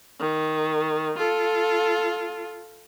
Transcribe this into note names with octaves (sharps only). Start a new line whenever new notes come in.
D#3
F4 A4